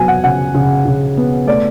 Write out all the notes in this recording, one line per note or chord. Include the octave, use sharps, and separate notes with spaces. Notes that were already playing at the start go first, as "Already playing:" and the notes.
Already playing: F#3 B3 G#5
F#5
C#3 F#5
C#3
C#3
B3
A3 D5